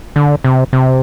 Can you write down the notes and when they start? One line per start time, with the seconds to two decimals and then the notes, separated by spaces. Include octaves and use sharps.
0.16 D3
0.44 C3
0.73 C3